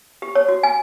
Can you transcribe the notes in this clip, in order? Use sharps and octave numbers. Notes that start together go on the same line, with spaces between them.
G4
C#5
F#4
G#5